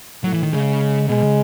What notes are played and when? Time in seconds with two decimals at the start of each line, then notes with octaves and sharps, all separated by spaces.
0.24 A2 F#3
0.33 E3
0.43 D#3
0.52 C#3 G#3
1.08 B2 G#3
1.23 C#3